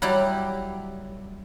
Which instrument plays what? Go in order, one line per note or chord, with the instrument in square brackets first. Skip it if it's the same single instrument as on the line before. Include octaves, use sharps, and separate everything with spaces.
[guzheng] F#3 G3 E4 G4